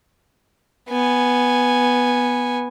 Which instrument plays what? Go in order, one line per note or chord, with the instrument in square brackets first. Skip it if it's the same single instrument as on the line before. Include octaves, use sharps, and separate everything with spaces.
[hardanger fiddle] B3 G#5